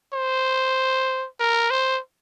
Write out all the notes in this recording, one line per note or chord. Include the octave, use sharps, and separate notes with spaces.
C5
A#4
C5